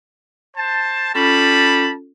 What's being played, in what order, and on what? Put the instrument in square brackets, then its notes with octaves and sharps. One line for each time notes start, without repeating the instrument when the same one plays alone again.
[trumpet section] C5 A5
[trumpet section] G3 A5 B5 [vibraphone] C#4 F4 A4